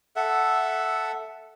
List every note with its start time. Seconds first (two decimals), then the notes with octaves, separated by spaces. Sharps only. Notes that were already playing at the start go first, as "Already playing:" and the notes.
0.16 A4 E5 F#5